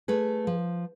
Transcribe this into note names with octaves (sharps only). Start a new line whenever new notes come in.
A3 G#4 B4
F3